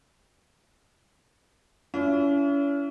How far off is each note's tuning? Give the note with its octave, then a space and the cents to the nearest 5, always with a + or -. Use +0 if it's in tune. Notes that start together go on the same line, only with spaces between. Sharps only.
C#4 +40 E4 +35